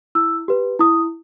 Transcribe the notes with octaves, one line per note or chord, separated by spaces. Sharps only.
E4 E6
G4 B4
E4 D#6